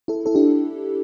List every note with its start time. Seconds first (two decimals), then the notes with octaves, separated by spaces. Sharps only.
0.08 E4 A4
0.26 E4 A4
0.35 D4 G4